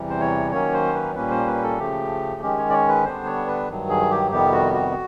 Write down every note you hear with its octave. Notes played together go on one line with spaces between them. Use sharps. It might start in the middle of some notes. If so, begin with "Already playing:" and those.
Already playing: E2 C3 E3 G3
C5
C#5
D#3 F#3 A#3 C#4 C#5
C5
B4
A#2 G3 A#3 C#4 B4
C5
B4
A4
C#3 F3 A3 G4
D#3 G#3 C#4 G4
C#5
D5
C#5
B4
D3 G3 B3 D4 C5
C#5
B4
G2 D#3 F#3
G#4
G4
F2 C3 D#3 G3 B3 G4
F#4
F#4